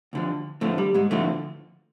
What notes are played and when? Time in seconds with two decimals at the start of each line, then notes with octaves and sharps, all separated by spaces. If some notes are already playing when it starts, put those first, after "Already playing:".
0.13 D2 D3 F3
0.61 D2 A2 D3 F3 A3
0.78 G3
0.94 G#2 G#3
1.11 D2 A2 D3 F3 A3